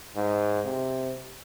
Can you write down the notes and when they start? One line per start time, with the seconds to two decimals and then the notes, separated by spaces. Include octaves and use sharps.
0.16 G#2
0.65 C3